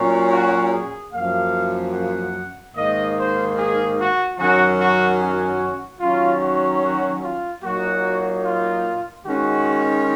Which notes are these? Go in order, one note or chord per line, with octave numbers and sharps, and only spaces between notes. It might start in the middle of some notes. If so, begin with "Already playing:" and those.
Already playing: A#2 F#3 C#4
F#4
G#4
F#2 F3 A#3 F5
F#5
G#2 D#3 A#3 D#5
C5
G#4
F#4
F#2 D#3 F#3 C#4 F#4
F#4
F#4
D#3 F#3 C#4 F4
F#4
F#4
F4
A#2 F#3 A#3 D#4 F#4
F4
D#3 G#3 C#4 F#4